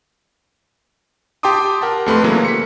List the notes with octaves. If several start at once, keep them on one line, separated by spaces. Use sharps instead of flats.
G4 G5 A5 C6 D6 D#6
A#4 F#5 A5
F2 A3 B4 C6
C#3 E3 F#3 A3 A#3
B6 C#7